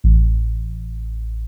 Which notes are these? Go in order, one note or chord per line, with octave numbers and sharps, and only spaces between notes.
A1